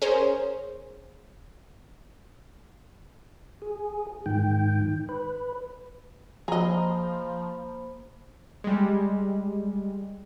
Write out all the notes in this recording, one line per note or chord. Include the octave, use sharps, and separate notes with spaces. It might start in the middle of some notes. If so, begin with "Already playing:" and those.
C#4 G#4 A#4 C5
G#4
G#2 D#3 G5
B4
F3 A#3 G#4 C5 D#5 A#5 B5
G3 G#3